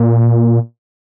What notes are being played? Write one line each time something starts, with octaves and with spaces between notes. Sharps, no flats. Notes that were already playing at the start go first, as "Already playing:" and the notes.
Already playing: A#2